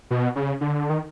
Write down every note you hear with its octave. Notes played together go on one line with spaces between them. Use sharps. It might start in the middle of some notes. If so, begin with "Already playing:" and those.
B2
C#3
D3
D#3